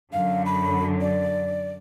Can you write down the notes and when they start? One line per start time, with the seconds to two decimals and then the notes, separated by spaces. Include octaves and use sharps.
0.13 F#2 D3 F#3 F5
0.46 B5
1.01 D5